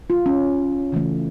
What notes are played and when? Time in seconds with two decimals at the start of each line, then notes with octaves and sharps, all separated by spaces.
0.10 F4
0.26 C#4
0.92 C#3 E3 A3